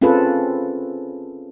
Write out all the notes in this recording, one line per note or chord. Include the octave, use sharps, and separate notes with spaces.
C4 C#4 F4 G#4 A4 B4